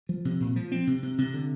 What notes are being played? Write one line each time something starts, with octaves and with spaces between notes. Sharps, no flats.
F3
C3
A#2
F3
C4
C3
C3
C3
D3